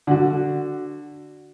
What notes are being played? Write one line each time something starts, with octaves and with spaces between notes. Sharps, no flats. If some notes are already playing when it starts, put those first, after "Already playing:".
D3 F#4